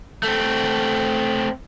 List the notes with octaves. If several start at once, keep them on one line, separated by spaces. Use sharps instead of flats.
A3 C4